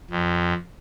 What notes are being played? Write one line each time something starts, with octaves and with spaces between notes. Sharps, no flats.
F2